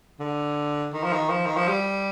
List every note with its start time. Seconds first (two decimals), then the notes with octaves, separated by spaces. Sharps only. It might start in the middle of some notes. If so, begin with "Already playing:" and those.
0.20 D3
0.93 D#3
1.03 F3
1.13 D#3
1.30 F3
1.46 D#3
1.57 F3
1.68 G3